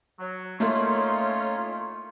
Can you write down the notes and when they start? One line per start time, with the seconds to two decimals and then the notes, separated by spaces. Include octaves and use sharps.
0.19 F#3
0.60 A2 A3 A#3 C#4 D#4 F4 C#5 C6